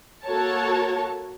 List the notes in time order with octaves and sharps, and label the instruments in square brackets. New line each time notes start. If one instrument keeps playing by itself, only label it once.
[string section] A#3 F#4 A4 A#4 C#5 A5